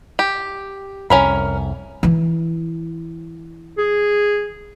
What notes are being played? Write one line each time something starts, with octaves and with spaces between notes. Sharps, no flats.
G4
C2 F2 C#4 A#4 B5
E3 E4
G#4